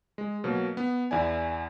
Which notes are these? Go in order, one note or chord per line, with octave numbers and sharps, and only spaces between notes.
G#3
B2 F#3 A#3
B3
E2 E4 D5 G#5